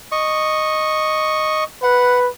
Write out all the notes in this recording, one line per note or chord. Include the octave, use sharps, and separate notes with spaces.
D#5 C#6
B4 F#5